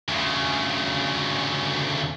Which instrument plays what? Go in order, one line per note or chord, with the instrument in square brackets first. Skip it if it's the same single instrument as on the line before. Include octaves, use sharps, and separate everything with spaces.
[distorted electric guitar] D2 C#3